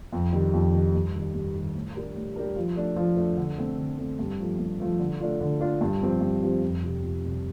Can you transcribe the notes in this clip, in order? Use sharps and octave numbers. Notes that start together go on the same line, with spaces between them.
F2
D#3 G3
F2
D#3 G3
G2
D#3 G3
G2
D#3 G3
A2
G3 D4 G4 A#4
A2
G3 D4 G4 A#4
F3
A3 D4
F3
A3 D4
D3
A3 C4
D3
A3 C4
G2
F3 A3
G2
F3 A3
D3
A3 D4 F4
D3
A3 D4 F4
G2
F3 C4 G4 C5
G2
F3 C4 G4 C5
F2
C3 G3
F2
C3 G3